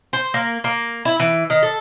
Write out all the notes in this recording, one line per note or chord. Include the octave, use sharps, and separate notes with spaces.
C5
A#3
A#3
E4
E3
D#3
A4